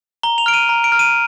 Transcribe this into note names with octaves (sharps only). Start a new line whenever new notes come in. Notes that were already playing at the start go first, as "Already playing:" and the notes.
A#5 G7
F7
F6 D7
D#7
A#5
D7
F6
D#7